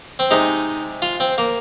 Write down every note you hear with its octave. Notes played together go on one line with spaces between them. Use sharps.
C4
C3 G#3 D#4
F4
C4
A#3